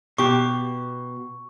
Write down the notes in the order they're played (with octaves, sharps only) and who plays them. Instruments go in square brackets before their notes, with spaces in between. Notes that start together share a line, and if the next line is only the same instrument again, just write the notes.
[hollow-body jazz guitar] B2 G4 [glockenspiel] C#6